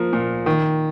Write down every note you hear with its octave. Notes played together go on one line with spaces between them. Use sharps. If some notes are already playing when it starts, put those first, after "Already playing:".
Already playing: F3 A#3
A#2
D#3